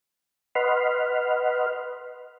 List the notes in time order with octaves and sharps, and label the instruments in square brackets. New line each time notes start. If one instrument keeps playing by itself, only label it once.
[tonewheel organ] B4 D#5 F#5 B5 C6 F6